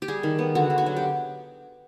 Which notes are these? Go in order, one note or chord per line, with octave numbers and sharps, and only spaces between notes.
G4
G3 G#4
D#3
B3
D3 F#4
D3
F#4
F#3
G4